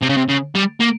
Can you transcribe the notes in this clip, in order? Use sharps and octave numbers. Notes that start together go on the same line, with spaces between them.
C3
C#3
C3
C#3
G3
A#3